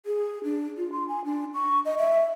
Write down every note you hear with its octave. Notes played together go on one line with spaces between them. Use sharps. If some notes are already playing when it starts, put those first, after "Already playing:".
G#4
D4
F4
C6
G#5
D4
C#6
D#5
E5